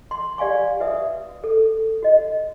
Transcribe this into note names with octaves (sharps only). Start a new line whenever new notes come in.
C6
G4 D5 F5 G#5 C#6
F#4 B4 E5 D#6
A4
F#4 D#5